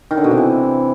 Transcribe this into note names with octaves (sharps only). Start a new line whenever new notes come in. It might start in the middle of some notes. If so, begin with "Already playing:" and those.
D#3
D3
B2
C3
E3